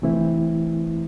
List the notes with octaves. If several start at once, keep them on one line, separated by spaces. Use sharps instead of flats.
C3 E3 A3 C4 E4